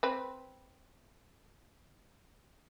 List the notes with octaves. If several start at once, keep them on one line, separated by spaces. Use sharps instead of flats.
C4 B4